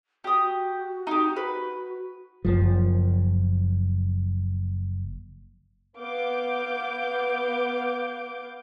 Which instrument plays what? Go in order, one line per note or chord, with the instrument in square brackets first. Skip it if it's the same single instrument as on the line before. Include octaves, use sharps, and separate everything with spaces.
[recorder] F#4 [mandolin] G4 D#6
[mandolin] D#4 G4
B4
[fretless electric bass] F#1 F3
[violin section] B3 F5 D6 G6